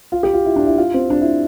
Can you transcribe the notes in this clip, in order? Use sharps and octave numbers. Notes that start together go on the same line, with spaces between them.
F4
G4
F4
E4
D4
E4
F4
C4
D4
E4